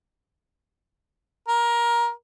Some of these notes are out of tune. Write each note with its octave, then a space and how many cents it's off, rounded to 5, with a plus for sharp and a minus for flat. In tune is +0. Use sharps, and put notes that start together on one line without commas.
A#4 +20